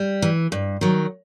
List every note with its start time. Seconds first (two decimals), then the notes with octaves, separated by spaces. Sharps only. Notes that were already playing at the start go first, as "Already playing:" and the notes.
Already playing: G3
0.22 E3
0.52 G2
0.81 D#3 F#3